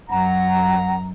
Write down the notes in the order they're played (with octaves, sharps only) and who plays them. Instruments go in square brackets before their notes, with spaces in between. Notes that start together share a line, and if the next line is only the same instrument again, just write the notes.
[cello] F#2 [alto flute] F#5 [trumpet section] A#5